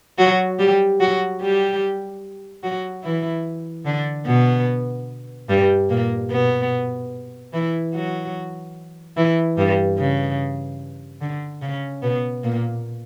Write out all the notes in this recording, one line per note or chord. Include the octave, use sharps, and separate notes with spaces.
F#3 F#4
G3 G4
F#3 F#4
G3 G4
F#3 F#4
E3 E4
D3 D4
B2 B3
G2 G3
A#2 A#3
B2 B3
E3 E4
F#3 F#4
E3 E4
G2 G3
C#3
D3
C#3 C#4
B2 B3
A#2 A#3